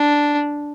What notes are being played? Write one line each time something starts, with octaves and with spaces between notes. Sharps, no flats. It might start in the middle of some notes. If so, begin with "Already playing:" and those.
Already playing: D4